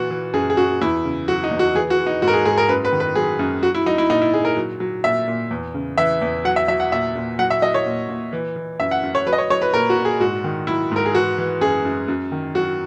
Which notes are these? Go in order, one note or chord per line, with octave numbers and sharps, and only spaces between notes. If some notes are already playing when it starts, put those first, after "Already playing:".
Already playing: A#2 E3 F#4
E3
F#2 G#4
G#4
F#2 F#4
E2 E4
C#3
F#3 F#4
D#4
E2
F#4
E3 G#4
F#4
E3
D#4
G#2 F#4
A#4
G#4
G#2 G#4
A#4
F#2 B4
B4
D#3
B4
F#3 G#4
F#2
F#3 F#4
E4
F#3 D#4
E4
A#2 D#4
E4
A#2 G#4
A#4
F#3
F#3
A#2 E5
A#2
E2
C#3
E3 E5
E2
F#3 F#5
E5
F#3 E5
F#5
A#2 E5
A#2
F#3 F#5
E5
F#3 D#5
C#5
A#2
A#2
E3
E3
F#2 E5
F#5
F#2
C#5
F#3 B4
D#5
C#5
F#3 C#5
B4
A#2 A#4
F#4
A#2
G#4
G#2 F#4
D#3
F#3 E4
G#2 A#4
G#4
E3 F#4
E3
F#2 G#4
F#2
F#2
D#3
F#3 F#4